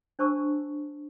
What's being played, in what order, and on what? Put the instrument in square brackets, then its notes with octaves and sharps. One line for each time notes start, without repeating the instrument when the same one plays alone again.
[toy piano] D4 C5 A5 C#6 E6